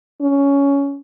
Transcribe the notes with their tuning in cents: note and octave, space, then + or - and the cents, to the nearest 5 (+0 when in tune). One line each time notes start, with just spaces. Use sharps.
C#4 +15